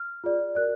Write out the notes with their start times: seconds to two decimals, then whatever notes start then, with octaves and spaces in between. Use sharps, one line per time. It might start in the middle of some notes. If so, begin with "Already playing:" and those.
Already playing: F6
0.24 F4 G#4 D5
0.55 F#4 A#4 D5 F#6